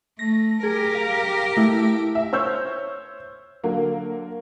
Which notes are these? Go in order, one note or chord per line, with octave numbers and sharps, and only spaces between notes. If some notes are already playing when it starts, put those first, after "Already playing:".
A3 A#6
G4 G#4 A#4
F5
A3 E4
E5
C5 C#5 E6 F6 G6
D3 F#3 A#3